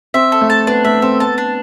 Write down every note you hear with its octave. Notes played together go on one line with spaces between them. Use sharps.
C4 E5
A4
A3
A5
B3 D4
A3 E5
C4 A4
B3 A5
D4